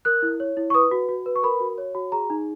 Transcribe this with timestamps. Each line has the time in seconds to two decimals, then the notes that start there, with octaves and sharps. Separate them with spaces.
0.05 A#4 F#6
0.22 E4
0.40 C#5
0.57 E4
0.70 C#6
0.74 B4 D#6
0.91 F#4
1.09 F#4
1.26 B4
1.36 C#6
1.43 A#4 B5
1.60 F#4
1.78 C#5
1.95 F#4
2.12 G#4 A#5
2.30 D#4